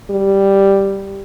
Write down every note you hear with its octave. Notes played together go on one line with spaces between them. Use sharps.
G3